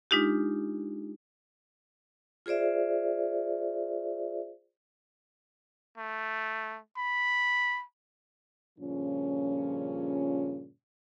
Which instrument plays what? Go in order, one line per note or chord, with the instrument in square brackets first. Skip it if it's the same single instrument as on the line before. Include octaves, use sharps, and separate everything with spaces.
[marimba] G#3 D4 D#4 F4 G4
[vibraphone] F4 G#4 C5 D5 E5
[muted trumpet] A3
B5
[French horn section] G2 A#2 C#3 F3 C#4